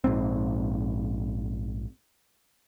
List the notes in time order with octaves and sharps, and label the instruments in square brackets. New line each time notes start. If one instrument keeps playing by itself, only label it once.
[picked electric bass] A#1 G#2 C4